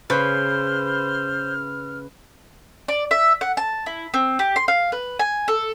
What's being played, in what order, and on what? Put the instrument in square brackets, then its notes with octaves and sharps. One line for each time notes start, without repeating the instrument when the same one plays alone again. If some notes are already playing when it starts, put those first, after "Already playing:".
[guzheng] C#3 [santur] B4 [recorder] C5 [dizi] F6
[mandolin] D5
E5
F#5
A5
E4
C4
G4
C6
F5
B4
G#5
A4